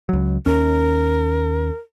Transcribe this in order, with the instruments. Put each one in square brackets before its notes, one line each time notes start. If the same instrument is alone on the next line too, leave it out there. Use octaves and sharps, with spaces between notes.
[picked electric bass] C#2 F#3
[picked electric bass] D#2 C#4 [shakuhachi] A#4